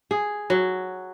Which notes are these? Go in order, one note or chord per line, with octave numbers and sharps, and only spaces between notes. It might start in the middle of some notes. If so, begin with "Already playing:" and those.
G#4
F#3